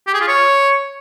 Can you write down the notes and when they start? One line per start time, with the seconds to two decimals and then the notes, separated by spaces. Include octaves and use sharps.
0.07 G4
0.14 G#4
0.21 F4
0.28 C#5